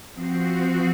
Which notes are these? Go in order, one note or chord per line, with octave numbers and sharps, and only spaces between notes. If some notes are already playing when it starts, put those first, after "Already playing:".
F3 C4 F#4